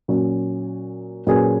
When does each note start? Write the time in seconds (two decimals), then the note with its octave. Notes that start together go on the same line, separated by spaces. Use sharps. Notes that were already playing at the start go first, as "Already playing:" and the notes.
0.08 A#2 F#3 C#4
1.27 A#2 F#3 C#4 G#4 B4